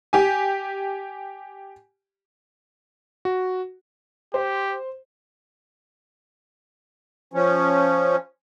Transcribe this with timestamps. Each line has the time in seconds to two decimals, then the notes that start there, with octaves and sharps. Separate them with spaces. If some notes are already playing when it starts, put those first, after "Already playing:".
0.13 G4 G#5
3.25 F#4
4.34 G4 C5
7.34 F3 C#4